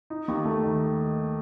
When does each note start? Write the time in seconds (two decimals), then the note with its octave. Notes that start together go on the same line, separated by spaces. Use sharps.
0.10 D#4
0.28 D#2
0.45 A3
0.63 D#3